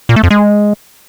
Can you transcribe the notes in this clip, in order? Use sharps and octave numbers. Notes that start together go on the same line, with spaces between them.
A#2
A3
F2
G#3